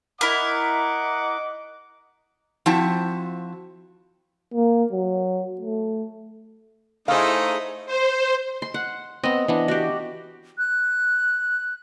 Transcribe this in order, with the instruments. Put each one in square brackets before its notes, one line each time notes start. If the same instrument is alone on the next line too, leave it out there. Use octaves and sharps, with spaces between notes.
[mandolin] E4 A#4 [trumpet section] D#5 F#5 D6
[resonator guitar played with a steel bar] F3 C4 E4 F#4 A5
[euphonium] A#3
F#3
A3
[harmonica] A3 D#4 [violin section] E4 G#4 D#6 [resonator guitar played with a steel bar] C5 F5
[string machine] C5
[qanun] C6
F#5
[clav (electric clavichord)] B3 C4 [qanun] D#5
[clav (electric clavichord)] E3 B3 D4
[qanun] F#4 G4
[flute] F#6